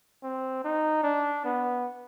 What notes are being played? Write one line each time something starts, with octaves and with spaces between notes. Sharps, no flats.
C4
D#4
D4
B3